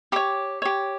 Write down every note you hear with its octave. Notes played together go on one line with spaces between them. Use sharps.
G4 C#5 D6
G4 C#5